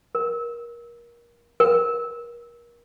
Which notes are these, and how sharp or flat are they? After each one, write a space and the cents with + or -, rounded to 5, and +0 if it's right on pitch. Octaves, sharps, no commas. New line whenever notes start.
A#4 +25
A#4 +30